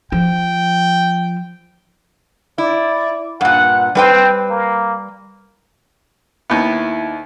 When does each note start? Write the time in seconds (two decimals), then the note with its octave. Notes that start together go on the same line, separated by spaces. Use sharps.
0.12 F3 G5
2.58 E4 D5
3.41 G2 A#2 F#5
3.95 G3 C4 B4 G5
4.50 A#3
6.50 D#2 B3 D#4 E4 E5